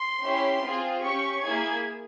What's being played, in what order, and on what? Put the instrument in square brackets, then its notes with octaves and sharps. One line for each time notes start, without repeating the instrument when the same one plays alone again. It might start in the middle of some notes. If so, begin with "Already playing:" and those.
Already playing: [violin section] C6
C#4 E4 G4
C4 F4 G#4
C#4 G4 C#6
A#3 E4 G#4 G#6